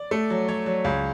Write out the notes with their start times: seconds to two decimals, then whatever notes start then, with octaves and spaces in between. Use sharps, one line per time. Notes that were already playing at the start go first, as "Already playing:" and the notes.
Already playing: D5
0.11 A3
0.30 F#3
0.48 F#3 C#5
0.66 F#3
0.84 C#2